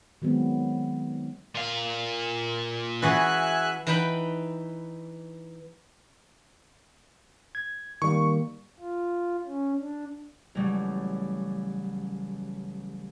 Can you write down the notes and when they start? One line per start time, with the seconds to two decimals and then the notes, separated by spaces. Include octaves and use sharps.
0.22 D#3 F#3 G#3 B3 C4
1.55 A#2 F5
3.02 E3 F#4 G#4 E5 G#5 F#6
3.87 E3 D#4 B4 G5 B5
7.55 G#6
8.02 D#3 G3 A#3 C#6
8.80 F4
9.46 C#4
9.80 D4
10.55 A1 C#3 F#3 G3